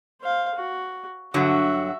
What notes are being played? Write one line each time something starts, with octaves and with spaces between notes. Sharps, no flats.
C5 F5
F#4
G2 D3 F#3 F#4 E5